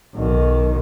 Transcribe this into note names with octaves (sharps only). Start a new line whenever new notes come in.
B1 D#3